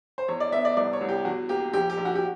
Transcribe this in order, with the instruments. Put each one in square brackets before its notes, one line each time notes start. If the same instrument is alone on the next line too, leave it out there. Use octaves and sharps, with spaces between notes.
[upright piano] C5
E2 C#5
D5
B3 E5
D5
C2 D5
C#5
C2
G4
E2 F#4
A#3 G4
A#1 G4
G4
A#1
F#4
G4